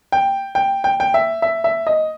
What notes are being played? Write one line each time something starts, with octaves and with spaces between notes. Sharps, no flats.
G5
G5
G5
G5
E5
E5
E5
D#5